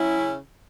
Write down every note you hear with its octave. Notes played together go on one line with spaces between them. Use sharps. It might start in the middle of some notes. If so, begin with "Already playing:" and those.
Already playing: F#3 C#4 E4
C#3